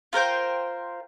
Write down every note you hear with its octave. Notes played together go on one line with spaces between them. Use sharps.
F4 A#4 C5 G5